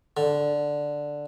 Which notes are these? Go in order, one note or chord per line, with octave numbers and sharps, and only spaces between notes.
D3